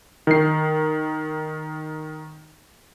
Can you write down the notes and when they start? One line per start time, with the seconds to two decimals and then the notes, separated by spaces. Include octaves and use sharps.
0.27 D#3 C7